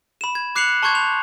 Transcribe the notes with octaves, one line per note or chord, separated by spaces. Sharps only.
B5 E7
G#6
D6 F#6 C7 C#7 F7 F#7
A5 C6 C#6 G6 G#6
F7